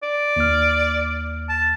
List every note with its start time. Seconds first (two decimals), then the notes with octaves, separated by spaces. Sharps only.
0.03 D5
0.36 D#2 F6
1.49 A5